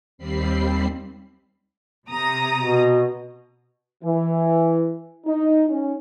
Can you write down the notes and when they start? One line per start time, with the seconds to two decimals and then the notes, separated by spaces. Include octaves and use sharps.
0.18 D#2 G3 C4 B5 C7
2.09 C3 A#5 D#6
2.59 B2
4.04 E3
5.26 D#4
5.70 C#4